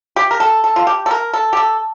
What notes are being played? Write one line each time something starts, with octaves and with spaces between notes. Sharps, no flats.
G4
A#4
A4
A4
F4
G4
A4
A#4
A4
G4
A4